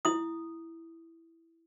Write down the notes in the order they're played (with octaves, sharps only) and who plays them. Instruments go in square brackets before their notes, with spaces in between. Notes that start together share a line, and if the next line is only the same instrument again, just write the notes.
[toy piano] E4 D#6